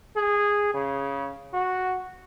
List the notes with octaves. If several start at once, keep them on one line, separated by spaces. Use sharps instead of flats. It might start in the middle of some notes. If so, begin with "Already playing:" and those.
G#4
C#3
F#4